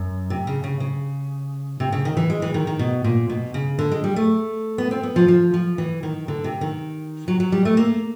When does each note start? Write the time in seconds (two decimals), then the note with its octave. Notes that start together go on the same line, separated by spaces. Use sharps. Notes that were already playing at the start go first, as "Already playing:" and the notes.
Already playing: F#2
0.30 C3
0.47 C#3
0.64 C#3
0.80 C#3
1.80 C3
1.92 C#3
2.05 D#3
2.17 E3
2.30 G#3
2.42 E3
2.54 D#3
2.67 D#3
2.79 B2
3.04 A#2
3.30 B2
3.54 C#3
3.79 D3
3.92 G#3
4.04 G3
4.16 A3
4.78 B3
4.91 C4
5.03 B3
5.16 F3
5.28 F3
5.54 F3
5.78 E3
6.03 D#3
6.28 D3
6.44 C3
6.61 D#3
7.28 F#3
7.40 F#3
7.52 G3
7.65 A3
7.77 A#3